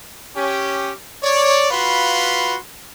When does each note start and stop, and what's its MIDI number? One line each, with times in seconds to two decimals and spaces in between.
0.36 0.92 61
0.36 0.92 67
1.23 1.68 73
1.23 1.68 74
1.71 2.57 65
1.71 2.57 66
1.71 2.57 71
1.71 2.57 77
1.71 2.57 83
1.71 2.57 84